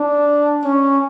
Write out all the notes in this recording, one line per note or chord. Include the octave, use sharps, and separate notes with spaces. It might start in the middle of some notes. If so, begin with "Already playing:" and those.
Already playing: D4
C#4